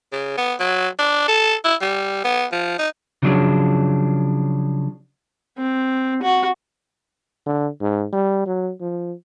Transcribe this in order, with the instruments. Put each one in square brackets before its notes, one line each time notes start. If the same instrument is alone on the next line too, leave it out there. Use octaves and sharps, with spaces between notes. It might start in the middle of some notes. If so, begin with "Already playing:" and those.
[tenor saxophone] C#3
B3
F#3
D4
A4
E4
G3
B3
F3
D#4
[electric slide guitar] C#3 F3 F#3 D4 G#4
[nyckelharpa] C4
F#4
[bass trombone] D3
G#2
G3
F#3
F3